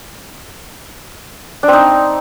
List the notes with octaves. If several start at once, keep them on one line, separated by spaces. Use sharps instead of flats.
D4
C4
D#4